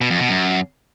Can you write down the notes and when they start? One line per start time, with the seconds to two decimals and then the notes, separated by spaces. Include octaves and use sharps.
0.01 B2
0.10 F2
0.20 B2
0.29 F#2